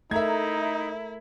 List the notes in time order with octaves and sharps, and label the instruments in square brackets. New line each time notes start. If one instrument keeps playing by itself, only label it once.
[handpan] A3 A#4 [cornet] D#4 [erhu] E4 [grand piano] E5 A#5 G#6